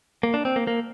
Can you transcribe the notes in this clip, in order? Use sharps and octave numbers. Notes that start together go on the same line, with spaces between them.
A#3
D4
C4
A#3
A#3